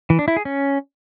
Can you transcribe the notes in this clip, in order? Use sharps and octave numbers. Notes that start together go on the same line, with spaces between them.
E3
D4
E4
G#4
C#4